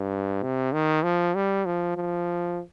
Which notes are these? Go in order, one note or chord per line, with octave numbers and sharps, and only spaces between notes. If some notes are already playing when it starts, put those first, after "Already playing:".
Already playing: G2
C3
D#3
F3
G3
F3
F3